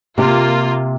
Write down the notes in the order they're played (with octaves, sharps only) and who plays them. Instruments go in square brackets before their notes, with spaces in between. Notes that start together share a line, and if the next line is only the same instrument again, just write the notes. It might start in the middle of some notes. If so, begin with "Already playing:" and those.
[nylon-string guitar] C3 G4 [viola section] A#3 F4